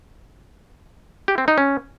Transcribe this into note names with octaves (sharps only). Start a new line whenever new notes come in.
G4
C4
D#4
C#4